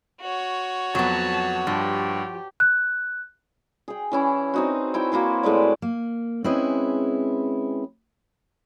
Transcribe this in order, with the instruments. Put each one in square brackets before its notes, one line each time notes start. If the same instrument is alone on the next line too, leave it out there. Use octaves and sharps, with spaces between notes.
[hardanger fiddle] F#4 C#5
[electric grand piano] F2 [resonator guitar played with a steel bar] F#3 B3 [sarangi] A5
[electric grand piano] G2 [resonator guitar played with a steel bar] F3 [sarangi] G4
[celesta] F#6
[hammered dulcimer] G#4 G5
E3 C#4 E4
C4 D#4 F#4
E4 G5 G#5
A#3 E4 F#4 C5
A2 G#3 B4 D5
[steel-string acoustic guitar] A#3
G#3 C4 C#4 E4 G#4 B4